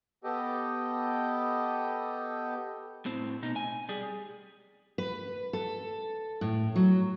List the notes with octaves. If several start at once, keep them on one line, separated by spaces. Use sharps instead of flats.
B3 G4 A4 D#5 G5
A2 C4
B2 D#4
G#5
G3 G#4
B4
A4
A2
F#3